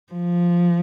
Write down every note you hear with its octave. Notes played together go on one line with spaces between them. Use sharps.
F3